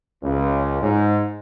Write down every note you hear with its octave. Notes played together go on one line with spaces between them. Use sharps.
C#2
G#2